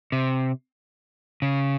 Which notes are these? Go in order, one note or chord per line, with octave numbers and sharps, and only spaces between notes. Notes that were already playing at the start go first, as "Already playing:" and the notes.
C3
C#3